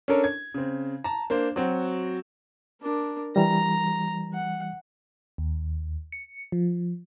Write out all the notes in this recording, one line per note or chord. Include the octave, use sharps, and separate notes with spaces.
C#4 D4 A4 A#4 C#5
G#6
C#3 C4
A5 A#5
A#3 D4 C5
F#3 C4 F#4
D4 A#4
E3 G3 A#5
F#5
D#2
C#7
F3